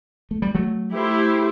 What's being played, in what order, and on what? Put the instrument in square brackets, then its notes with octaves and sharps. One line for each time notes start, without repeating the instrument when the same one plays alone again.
[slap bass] A3
G3
F#3 A3
[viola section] A3 E4 G4 C5